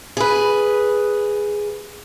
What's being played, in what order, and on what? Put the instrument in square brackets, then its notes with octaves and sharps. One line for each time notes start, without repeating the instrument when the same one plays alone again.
[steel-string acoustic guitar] G#4 B4